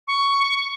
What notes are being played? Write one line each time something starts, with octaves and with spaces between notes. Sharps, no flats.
C#6